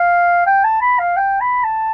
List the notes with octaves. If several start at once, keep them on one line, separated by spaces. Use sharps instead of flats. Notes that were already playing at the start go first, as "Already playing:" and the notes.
Already playing: F5
G5
A5
B5
F5
G5
B5
A5